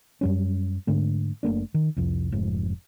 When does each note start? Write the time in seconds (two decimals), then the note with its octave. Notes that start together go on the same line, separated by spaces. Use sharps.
0.21 F#2 G3 C#4
0.87 G#2 D3 A3
1.43 F#1 A3 A#3 D4
1.74 D#3
1.97 C2 F2
2.32 F1 F2 G#2